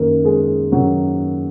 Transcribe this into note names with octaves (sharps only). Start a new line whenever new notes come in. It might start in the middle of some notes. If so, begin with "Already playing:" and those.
Already playing: F#2 D#3 A#3 A#4
G#3 G#4
F#2 D#3 F#3 F#4